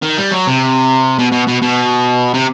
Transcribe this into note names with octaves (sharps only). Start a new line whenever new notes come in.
D#3
G3
F#3
C3
B2
B2
B2
B2
C3